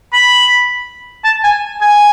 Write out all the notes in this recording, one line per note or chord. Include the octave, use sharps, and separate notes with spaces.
B5
A5
G#5
G#5